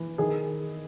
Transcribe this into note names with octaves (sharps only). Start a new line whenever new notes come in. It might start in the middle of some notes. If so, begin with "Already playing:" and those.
Already playing: E3
D#3 G#4